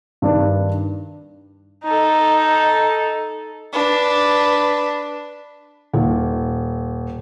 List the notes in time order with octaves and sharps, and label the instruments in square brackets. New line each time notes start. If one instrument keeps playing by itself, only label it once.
[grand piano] G2 D#3 D4
[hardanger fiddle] D#4 A4
[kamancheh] D4 B4
[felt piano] D#1